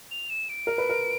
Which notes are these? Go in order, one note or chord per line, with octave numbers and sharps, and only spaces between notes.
F7
E7
D7
A#4
B4
A#4